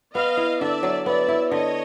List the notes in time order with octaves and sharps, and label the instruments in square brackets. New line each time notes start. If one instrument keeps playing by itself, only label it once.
[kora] B3 [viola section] D#5 F5
[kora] E4
[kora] D3 [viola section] D5 E5
[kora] F#3
[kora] B3 [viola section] D5 E5
[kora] E4
[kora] D3 [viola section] C#5 D#5